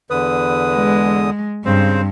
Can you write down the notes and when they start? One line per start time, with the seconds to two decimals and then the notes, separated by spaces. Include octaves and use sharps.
0.11 E2 D3 B4 D#6
0.75 G#3
1.66 G2 C#3 C4 C5